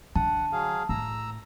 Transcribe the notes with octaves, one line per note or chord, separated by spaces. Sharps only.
D3 F#5 A5
F#3 G#4 F5
A2 A#5 E6